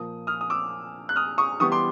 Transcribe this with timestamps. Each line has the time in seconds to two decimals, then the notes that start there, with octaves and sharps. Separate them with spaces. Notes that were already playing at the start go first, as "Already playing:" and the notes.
Already playing: A#2 F3 A#3 D#6
0.27 D#6 F6
0.41 D#6
0.50 D6 E6
1.09 F#6
1.16 D#6 F6
1.38 C#6 D#6
1.60 E3 G3 B3 C#6 D#6
1.72 C6 D6